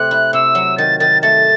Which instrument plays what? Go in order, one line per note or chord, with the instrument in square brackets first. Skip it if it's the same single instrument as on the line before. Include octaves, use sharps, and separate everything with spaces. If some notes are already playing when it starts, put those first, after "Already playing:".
Already playing: [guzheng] C3 A3 C4 [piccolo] F#6
[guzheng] E4
[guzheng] C3 [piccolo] E6
[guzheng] F#3
[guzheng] D#3 [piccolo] A6
[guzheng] D#3 [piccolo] A6
[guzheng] A3 [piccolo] A6